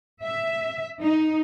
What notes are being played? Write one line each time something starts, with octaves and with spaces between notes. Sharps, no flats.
E5
D#4